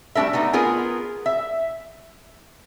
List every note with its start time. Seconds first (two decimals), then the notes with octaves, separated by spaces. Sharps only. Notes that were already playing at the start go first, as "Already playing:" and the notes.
0.15 G3 A3 D4 A#4 E5
0.33 A3 B3 D#4
0.53 B3 F4 G#4 A#4
1.26 E5